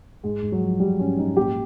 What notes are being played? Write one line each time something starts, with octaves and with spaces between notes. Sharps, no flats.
G#2 G#3
G#2
F#3
F3
G#2 G3
G#2 C#4
G#2 D#4
A#2 G4